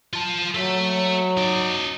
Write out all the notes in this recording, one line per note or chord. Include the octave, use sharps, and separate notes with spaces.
F4 A5
F#3 A4 E5
D#4 D5